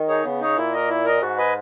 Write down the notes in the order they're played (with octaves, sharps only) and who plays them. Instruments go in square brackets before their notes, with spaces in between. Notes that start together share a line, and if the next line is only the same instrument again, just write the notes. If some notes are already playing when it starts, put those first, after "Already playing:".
Already playing: [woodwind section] D#3
[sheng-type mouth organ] D#4 G#4 C#5
[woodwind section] C#3 [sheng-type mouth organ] B3
[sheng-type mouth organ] D#4 G#4 C#5
[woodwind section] A#2 [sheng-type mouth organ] E4
[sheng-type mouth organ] A#4 D#5
E4
A#4 D#5
[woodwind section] G#2 [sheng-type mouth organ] F#4
[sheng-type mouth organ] B4 D#5 G#5